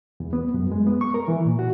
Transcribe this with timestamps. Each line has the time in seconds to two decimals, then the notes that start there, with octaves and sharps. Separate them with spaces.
0.20 E2
0.33 B3
0.54 F#2
0.72 G#3
0.87 B3
1.01 C#6
1.14 A#4
1.28 E3
1.45 A#2
1.59 F#4